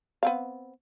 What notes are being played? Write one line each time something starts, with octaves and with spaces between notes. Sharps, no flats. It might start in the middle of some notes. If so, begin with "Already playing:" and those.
B3 C4 F5